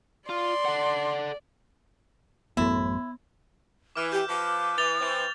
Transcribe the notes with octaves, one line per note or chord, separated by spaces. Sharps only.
F4 D5 C6
A4 F#5
A1 F#2 A3 B3 E4
E3 D6 F6
G4 G6
F3 B4 D6
E3 A6 F7 G7
E3 C4